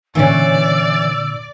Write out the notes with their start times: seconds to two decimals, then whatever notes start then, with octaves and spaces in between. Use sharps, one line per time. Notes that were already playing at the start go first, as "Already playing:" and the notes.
0.15 A#2 D3 E3 C#4 D5 E6